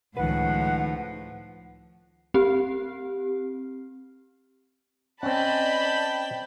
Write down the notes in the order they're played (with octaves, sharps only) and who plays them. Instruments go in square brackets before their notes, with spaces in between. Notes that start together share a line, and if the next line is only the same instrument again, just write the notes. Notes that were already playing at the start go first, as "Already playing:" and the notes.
[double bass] C#2 [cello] A2 F3 [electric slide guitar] D#3 B4 [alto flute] F#5
[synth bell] C4 G4
[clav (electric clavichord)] C4 C#4 [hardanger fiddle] D5 D#5 [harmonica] G5 [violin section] A5 B5